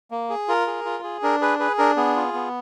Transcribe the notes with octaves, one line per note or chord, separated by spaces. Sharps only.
A#3
G#4
F4 A#4
G#4
F4
G#4
D4 A#4
G#4 B4
G#4 B4
D4 A#4
B3 G#4
F4
B3